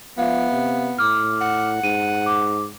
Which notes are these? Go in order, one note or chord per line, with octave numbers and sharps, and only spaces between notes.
F3 B3 E5 F5
C3
A2 D6 F6
F#5
G#2 D#7
D6